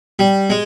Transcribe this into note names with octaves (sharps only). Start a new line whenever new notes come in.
G3
G#3